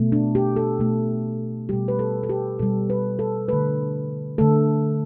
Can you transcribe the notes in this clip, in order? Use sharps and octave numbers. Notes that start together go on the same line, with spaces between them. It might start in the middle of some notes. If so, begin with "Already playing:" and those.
Already playing: B2 A3
D4
G4
A4
B2 A3
B2 G3 G4
B4
A4
A4
G4
B2 G3 A4
B4
A4
D3 A3 B4
D3 A3 A4